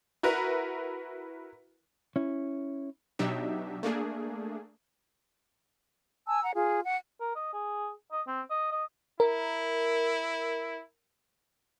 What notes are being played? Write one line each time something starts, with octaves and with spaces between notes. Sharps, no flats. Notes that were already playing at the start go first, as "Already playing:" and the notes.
E4 F#4 A#4 B4
C#4 E4
B2 F#3 D4 D#4 G4 E5
A3 A#3 D4 G#4
G#5 A5 E6
F#5 A#5
F4 G#4
F#5
A#4
D#5
G#4
D#5
C4
D#5
D#5
E4 A#4